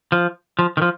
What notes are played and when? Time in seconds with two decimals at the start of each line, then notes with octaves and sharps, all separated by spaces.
0.12 F3
0.59 F3
0.77 D#3
0.82 F3